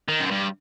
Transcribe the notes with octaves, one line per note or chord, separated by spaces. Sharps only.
D#3
F#2
G2